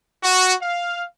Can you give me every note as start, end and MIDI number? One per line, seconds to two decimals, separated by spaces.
0.22 0.54 66
0.61 1.03 77